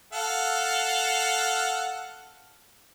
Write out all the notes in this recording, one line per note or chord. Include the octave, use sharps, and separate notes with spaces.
A4 F5 F#5